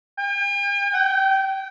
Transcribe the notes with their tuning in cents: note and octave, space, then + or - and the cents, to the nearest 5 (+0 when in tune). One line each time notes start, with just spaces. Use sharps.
G5 +45
G5 -20